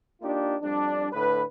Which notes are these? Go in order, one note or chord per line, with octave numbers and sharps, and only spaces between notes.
A#3 D4 D#4 F4 G4
F2 G3 D4
A2 D3 B4